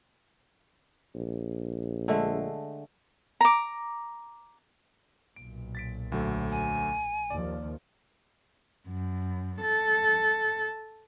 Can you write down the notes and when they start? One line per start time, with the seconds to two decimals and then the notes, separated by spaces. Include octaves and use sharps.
1.15 A#1
2.08 D3 G#3 A3
3.41 A#5 D6
5.36 B1 A#2 D7
5.75 A6 B6 D7
6.12 D2 F#3 A3
6.50 G#5
7.30 D#2 F3 D5
8.88 F#2
9.62 A4